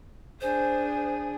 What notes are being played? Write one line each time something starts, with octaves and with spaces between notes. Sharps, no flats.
D4 G#4 C5